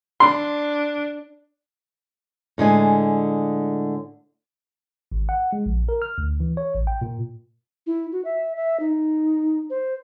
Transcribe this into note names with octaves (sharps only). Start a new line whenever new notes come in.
D4 C6
A2 D3 G#3 G#5
G#1
F#5
G#3
A#1
A#4
F6
D2
E3
C#5
A1
G5
A#2
E4
F#4
E5
E5
D#4
C5